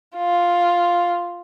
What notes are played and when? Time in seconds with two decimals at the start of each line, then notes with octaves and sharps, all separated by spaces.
0.17 F4